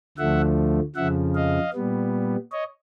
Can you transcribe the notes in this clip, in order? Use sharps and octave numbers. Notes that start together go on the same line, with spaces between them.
D2 D3 F3 A3 E5 F#5
F2 C#3 F3 E5 F#5
D#5 F5
A#2 G3 B3
C#5 D#5